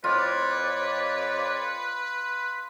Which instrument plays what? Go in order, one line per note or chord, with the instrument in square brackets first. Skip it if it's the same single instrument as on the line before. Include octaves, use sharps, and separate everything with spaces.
[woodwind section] F2 C#5 D5 [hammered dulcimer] F4 [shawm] B4